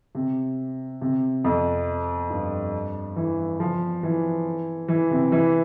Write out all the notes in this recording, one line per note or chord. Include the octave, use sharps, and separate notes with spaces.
C3
C3
F2
G2
E3
F3
E3
E3
C3
E3